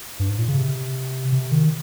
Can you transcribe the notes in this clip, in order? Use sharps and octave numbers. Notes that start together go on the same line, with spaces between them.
G2
G#2
A#2
C#3
C3
C3
D#3